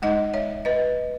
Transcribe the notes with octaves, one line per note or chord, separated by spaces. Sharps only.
G#3 D#4 D#5 F#5
C#5 E5
B4 D#5